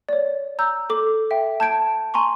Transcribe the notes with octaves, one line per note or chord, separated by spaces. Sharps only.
C#5 D5
A#5 E6 G6
A4 D6
E5 G5
A5 G6 G#6 D7
G#5 A#5 C6 C#6